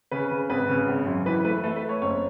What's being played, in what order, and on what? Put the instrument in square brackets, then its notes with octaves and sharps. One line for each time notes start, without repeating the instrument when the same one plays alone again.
[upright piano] C#3 B4
C#3
G#1 B4
C#3
G#1
F#2
E3 B4
A3 B4
A3 A4
B4
A3
C#5
F#1 C#5